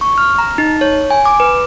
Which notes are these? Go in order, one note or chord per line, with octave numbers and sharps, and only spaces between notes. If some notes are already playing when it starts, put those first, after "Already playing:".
C#6
F6
A#5
D#4
C#5
G#5
D6
B4